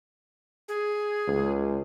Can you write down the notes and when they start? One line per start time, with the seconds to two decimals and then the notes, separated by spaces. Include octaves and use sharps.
0.68 G#4
1.27 C#2